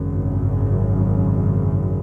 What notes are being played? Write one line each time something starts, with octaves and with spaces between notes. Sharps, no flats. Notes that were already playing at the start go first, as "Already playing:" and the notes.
Already playing: G#1 F#2 C#3